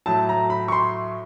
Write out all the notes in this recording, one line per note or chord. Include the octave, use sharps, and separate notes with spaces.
A2 F#3 A3 A5
A#5
B5
C#6
C6